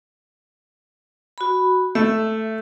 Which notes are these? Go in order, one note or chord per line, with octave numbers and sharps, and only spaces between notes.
F#4 B5
A3 E5